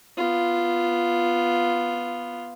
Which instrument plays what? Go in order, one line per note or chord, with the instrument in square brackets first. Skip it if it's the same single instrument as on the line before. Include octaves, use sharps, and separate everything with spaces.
[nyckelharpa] B3 F4